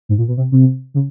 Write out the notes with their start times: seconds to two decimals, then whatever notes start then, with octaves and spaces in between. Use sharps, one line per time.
0.09 G#2
0.18 A#2
0.28 B2
0.37 C3
0.52 C3
0.94 C#3